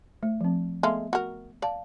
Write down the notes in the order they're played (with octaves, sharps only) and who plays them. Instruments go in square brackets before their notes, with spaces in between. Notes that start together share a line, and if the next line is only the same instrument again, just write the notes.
[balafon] A3
F3 C4
[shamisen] G#3 A4 F5 [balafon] A3 B3 E5
[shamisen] F#4 A#4
[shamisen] D5 [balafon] F5 A5